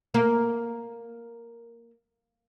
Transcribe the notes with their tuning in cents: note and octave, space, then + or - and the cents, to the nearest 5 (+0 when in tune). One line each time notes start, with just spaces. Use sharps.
A#3 +0